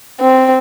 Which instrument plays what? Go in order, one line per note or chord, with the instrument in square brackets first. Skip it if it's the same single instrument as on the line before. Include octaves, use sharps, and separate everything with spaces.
[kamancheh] C4